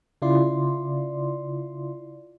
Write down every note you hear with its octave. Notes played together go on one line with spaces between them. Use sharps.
C#3 E4 F4 D5 C6